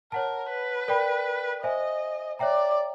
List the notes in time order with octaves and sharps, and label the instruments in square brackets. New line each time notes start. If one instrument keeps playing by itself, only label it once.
[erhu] A#4 [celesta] C#5 F#5 A5
[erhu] B4
[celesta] A#4 D5 G5 B5
[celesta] C5 E5 G#5 [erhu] D#5
[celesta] C#5 E5 G5 A#5 [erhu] D5